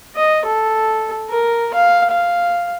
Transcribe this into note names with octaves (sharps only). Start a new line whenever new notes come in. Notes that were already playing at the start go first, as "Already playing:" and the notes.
D#5
A4
A#4
F5
F5